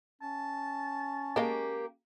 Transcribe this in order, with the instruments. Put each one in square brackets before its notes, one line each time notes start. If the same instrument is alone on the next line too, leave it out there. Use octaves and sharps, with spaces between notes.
[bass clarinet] C#4 [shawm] A5
[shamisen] G#3 D#5 F5 [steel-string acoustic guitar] A#3 G4